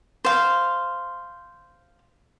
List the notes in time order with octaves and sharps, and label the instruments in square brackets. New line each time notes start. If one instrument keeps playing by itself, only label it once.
[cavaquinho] C5 F5